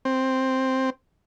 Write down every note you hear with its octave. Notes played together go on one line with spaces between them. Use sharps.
C4